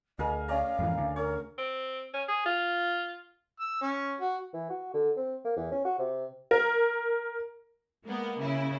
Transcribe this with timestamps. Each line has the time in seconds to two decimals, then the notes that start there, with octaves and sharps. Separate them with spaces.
0.19 D2 G#4 A#4 D#5 F5
0.48 C#4 D5 F5 A#5
0.79 F2 G#2 E3
0.98 D2 D3
1.16 A#4 C#5
1.58 C4
2.14 C#4
2.28 G#4
2.46 F4
3.60 E6
3.82 C#4
4.21 F#4
4.54 E3
4.70 F#4
4.94 D3
5.17 C4
5.45 A#3
5.56 E2
5.72 C#4
5.85 F#4
5.98 C3
6.51 A#4
8.05 G#3 A#3 B3
8.40 C#3 E4